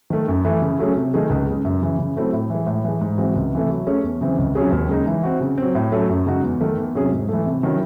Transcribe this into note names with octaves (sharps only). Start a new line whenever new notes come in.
D#3 A3
F#2
E3 A3
C#3
F#3 A3 C#4 G#4
C3
D#3 A3 D#4 G#4
C#2
C#3 G#3
F#2
C#3 E3
C#3
F#3 A3 C4 E4
A2
E3 G#3
A2
E3 G#3
G#2
E3 G#3 C4 F#4
C#2
C3 E3 A3
F#3
A3 C#4 G#4 C#5
E2
C#3 E3 C4
C#2
C3 F#3 C#4 G#4
D#2
C#3 G#3 D#4
E3
C4 F#4
C#3
F#3 C4
A2
F#3 A3 C#4
F#2
C#3 G#3 D#4 F#4
E2
D#3 A3
E2
C3 F#3 C#4 G#4
G#2
E3 A3
C3
D#3 F#3 C#4 E4